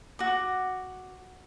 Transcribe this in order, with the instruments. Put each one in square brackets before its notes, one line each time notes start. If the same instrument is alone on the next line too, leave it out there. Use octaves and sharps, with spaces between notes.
[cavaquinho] F#4 D6